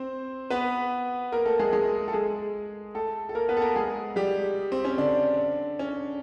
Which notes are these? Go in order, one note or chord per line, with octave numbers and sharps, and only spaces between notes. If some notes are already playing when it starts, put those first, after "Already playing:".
Already playing: C4 C5
B3 B4
A#3 A#4
A3 A4
G#3 G#4
G#3 G#4
A4
G#3 G#4
A3 A4
A4
A#3 A#4
B3 B4
A4
A#3 A#4
G#3 G#4
G3 G4
C4
C#4
D3 D4
C#4